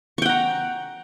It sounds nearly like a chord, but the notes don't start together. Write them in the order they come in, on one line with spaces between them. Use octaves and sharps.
C#6 G5 F#5 A#5